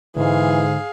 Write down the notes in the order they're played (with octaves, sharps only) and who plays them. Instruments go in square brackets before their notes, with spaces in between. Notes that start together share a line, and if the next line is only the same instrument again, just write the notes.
[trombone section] G#2 [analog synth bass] D3 [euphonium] E3 [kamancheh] G#4 F5